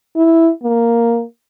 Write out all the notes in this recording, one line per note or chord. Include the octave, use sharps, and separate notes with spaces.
E4
A#3